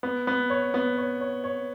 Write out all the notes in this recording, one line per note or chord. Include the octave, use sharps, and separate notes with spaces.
B3
B3
C#5
B3
C#5
C#5
C#5